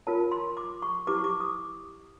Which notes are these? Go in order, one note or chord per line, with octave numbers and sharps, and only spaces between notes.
F4 A#4 C#5 A5
C6
D6
C#6
E4 G4 B4 D6
C#6
D6
D#6